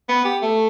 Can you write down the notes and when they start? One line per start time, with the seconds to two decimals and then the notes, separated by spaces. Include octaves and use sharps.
0.09 B3
0.25 G4
0.42 A3